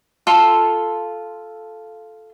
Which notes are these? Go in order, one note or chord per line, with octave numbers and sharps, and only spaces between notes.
F4 A4 C6